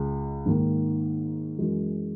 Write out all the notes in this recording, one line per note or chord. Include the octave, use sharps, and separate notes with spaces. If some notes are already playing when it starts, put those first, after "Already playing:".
Already playing: C#2 G#3
G#2 D#3 A#3
F#2 E3 G#3